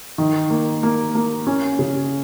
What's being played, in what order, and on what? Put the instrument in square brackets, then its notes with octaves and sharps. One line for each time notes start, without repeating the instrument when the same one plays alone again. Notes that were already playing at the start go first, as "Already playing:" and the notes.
[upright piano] D#3
A#3
A#3
A#3
C#4
C#3